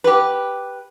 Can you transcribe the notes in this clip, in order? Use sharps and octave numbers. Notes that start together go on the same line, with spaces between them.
G4 B4